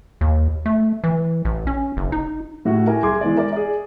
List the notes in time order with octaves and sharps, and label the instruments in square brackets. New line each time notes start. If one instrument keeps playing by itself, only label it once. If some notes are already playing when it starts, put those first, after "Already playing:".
[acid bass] D#2
A3
E3
A1
C#4
F#1
D#4
[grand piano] A2 E4 F#4
E4 G4 A#4 G#5
C2 G#4 C6 D6 G#6
E3 G#3 B3 D5
A#4 D5
G#4 D5